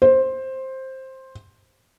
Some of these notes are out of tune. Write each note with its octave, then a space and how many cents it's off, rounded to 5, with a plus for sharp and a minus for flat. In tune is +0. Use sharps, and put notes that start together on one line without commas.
C5 +10